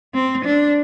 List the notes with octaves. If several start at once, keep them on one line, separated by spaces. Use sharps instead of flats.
C4
D4